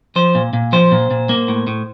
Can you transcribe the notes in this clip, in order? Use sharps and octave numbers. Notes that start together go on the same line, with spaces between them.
F3 C5
A#2
A#2
F3 C5
A#2
A#2
A#3
A2
A2